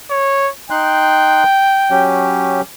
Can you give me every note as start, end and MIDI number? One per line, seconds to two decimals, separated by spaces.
0.10 0.49 73
0.70 1.43 63
0.70 2.07 79
0.70 1.43 84
0.70 1.43 90
1.91 2.61 54
1.91 2.61 61
1.91 2.61 67